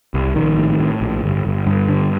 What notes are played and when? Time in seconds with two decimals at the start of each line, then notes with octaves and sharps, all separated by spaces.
0.14 C2
0.35 A#1 D#3
0.58 A2
0.79 A2
1.01 A#1
1.24 G1
1.45 G1
1.66 G2
1.88 D3